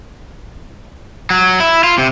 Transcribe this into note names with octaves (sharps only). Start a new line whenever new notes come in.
F#3
E4
F4
C3